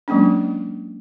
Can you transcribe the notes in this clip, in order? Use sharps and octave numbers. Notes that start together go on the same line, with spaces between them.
F#3 G#3 A#3 C#4 D4